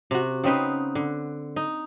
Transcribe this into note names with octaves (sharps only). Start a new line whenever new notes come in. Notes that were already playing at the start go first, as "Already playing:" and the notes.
C3 F#4
C#3 C4 D#4 B4
D3
D#4